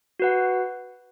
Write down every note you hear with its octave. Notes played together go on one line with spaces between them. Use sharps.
F#4 B4 F#5